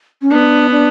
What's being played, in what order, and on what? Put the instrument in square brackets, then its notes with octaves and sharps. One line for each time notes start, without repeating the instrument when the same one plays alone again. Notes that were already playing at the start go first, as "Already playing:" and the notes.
[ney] C#4
[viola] B3 [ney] D4
[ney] D4